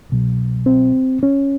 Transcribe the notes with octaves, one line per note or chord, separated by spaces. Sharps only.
C2 B2 F#3
C4
C#4